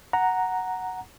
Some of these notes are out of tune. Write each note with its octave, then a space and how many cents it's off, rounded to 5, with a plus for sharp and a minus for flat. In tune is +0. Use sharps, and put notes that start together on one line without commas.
F#5 +0 A#5 +0